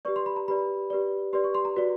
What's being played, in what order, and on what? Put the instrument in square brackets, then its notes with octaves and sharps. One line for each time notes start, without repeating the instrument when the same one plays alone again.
[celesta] G4 B4 D5 C#6
C6
B5
A#5
G4 B4 D5 B5
G4 B4 D5
G4 B4 D5 C6
C#6
C6
A#5
F#4 B4 D5